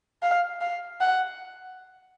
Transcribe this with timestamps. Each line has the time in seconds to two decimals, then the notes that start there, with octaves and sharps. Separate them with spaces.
0.23 F5
0.61 F5
1.01 F#5